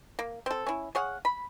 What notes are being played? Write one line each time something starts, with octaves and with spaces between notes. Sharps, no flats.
A#3
C4 A4
C#4 E4
G#4 C#5 F5 F#5
B5